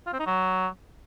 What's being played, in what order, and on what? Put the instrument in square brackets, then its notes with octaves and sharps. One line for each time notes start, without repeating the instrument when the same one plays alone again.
[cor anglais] F4
C4
D#4
F#3